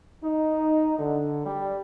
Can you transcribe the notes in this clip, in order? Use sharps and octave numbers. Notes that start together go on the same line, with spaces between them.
D#4
D3
G3